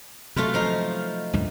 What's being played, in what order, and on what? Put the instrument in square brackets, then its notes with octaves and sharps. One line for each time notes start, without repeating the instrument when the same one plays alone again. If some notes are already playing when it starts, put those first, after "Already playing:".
[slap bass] C3 F#3 [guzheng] A3 F4 B4
[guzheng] F3 D#4 F5
[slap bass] C#2 G2 A#2